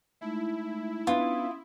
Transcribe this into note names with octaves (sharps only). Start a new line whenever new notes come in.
G#3 A3 D#4 E4
B3 C#4 D4 F4 D#6